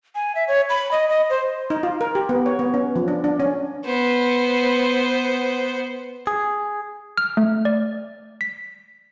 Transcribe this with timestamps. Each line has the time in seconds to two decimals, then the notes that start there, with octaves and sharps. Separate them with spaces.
0.15 G#5
0.35 E5
0.48 C#5
0.69 B5
0.92 D#5
1.09 D#5
1.30 C5
1.70 D#4
1.83 F4
2.01 A#4
2.15 G4
2.29 B3
2.46 C#5
2.59 B3
2.74 C#4
2.96 F3
3.08 D4
3.24 D4
3.40 C#4
3.85 B3 C5
6.27 G#4
7.18 F6
7.37 A3
7.65 D5
8.41 B6